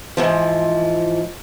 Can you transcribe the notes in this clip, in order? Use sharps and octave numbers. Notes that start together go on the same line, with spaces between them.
G#2 E3 F3